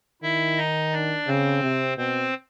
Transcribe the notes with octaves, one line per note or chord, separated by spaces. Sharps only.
D#3 E4 E5
D#4 D#5
D4 D5
C#3 C4 C5
C3
B2 C4 C5